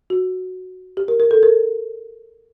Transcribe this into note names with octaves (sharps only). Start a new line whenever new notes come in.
F#4
G4
A#4
A#4
A4
A#4